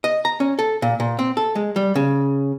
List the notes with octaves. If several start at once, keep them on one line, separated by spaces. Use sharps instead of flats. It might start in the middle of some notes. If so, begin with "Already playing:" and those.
D#5
A#5
C#4
A4
A#2
A#2
C4
A4
G#3
G3
C#3